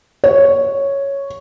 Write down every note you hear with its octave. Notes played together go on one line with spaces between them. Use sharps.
C#5